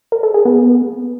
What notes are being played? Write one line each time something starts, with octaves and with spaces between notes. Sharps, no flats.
A#4
A4
G#4
B3